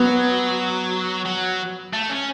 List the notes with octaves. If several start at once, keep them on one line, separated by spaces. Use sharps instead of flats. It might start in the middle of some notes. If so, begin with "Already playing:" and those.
Already playing: F#3 B3
F#3
A3
C#4